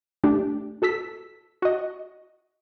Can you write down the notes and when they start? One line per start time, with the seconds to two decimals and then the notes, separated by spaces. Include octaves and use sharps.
0.24 A3 D4 G4
0.82 F#4 A4 E6 B6
1.62 F#4 D#5